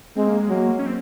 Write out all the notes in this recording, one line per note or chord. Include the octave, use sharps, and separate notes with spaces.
G#3 C4
A#3
G#3
F#3 A#3
C#4
C4